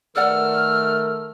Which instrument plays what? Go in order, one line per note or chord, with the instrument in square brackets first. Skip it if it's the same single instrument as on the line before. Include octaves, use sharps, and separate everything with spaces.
[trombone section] D#3 A3 A#4 [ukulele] B4 D5 F#5 [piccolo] E6 [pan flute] F6